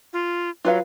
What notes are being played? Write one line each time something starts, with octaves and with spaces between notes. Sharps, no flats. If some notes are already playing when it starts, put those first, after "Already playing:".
F4
F#3 F4 B4 F5